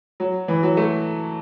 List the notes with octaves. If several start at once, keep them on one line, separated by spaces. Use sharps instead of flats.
F#3
E3
F#3
A3